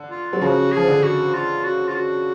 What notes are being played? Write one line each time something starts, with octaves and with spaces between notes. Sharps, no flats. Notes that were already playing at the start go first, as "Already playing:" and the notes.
Already playing: D3
F4
F#3
C#3 F3 F#4
F3 G#4
D3
F#4
F4
F#4
F4
F#4